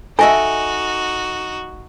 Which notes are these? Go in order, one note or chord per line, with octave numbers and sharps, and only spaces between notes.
D#4 F#4 A4 D#5 E5 G#5